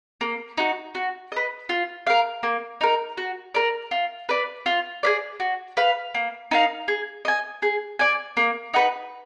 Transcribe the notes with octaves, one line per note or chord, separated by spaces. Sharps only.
A#3
D#4 F#4
F#4
B4 D#5
F4
A#4 F5
A#3
D#4 A#4
F#4
A#4 D5
F4
B4 D5
F4
G#4 B4 D5
F#4
B4 F5
A#3
D#4 A#4 F5
G#4
D#5 G#5
G#4
D5 G#5
A#3
D#4 F#4 B4